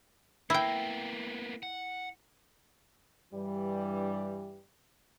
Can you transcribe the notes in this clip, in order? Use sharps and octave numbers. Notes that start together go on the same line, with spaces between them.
A#3 B3 E4 G5
F#5
G2 E3 G3